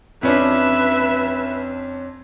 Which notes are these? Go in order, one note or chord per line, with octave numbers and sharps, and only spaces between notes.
F2 C#4 D4 B4 E5